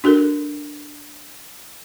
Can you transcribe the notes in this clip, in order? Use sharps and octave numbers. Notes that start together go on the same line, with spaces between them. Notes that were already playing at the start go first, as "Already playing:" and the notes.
D4 F#4 A4 A#4